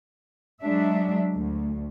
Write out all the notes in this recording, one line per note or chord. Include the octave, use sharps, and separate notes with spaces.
F#3 G#3 D4 E5
D2